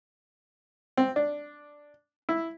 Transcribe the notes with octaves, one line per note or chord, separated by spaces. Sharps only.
C4
D4
E4